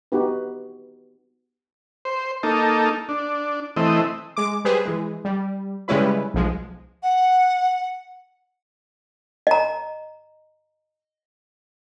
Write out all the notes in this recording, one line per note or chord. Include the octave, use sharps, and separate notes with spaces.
B3 D#4 F#4 G4 B4
C5
A#3 D#4 A4
D4
E3 A3 C4 D#5
G#3 D6
G3 G4 G#4 B4 C5
E3 G#3
G3
C#3 G3 G#3 C#4 E4 B4
B1 F3 G#3
F#5
D#5 A#5